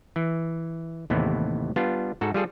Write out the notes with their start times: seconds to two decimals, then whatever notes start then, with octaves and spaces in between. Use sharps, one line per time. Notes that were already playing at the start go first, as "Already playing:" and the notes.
0.16 E3
1.10 D#2 A2 C3 E3 B3
1.76 G3 B3 D4 F4
2.21 G#2 F#4 A4
2.34 G3 F4 G#4 A4